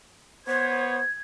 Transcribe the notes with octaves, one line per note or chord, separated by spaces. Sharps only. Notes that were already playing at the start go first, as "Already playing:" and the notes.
B3 C5 C#5 G#6